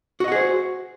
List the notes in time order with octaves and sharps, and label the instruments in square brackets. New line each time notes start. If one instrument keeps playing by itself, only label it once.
[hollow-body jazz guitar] F#4
D#5
F#5
G#4
C5